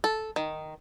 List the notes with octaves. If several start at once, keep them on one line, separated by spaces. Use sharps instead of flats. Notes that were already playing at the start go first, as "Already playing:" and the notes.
A4
D#3